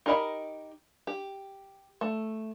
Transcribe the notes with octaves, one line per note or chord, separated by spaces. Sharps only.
D#4 G4 A#4 D#5 B5
G4
A3